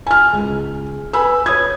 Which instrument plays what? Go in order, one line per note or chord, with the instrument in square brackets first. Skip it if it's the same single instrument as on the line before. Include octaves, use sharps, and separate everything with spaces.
[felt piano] G#5 F6
C#2
B4 G#5 B5 E6
C#5 D#6 G#6